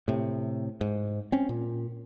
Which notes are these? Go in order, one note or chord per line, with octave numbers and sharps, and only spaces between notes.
A2 C3
G#2
C4 C#4
A#2